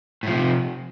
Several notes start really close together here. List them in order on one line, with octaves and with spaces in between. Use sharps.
A2 F3 C3